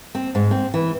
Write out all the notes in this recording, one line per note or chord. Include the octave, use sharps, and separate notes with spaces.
C4
G#2
C4
E3